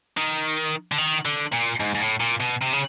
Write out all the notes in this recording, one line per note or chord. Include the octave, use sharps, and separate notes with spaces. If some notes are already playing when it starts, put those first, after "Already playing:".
D#3
D3
D#3
D3
A#2
G#2
G#2
A2
A#2
B2
C3
C#3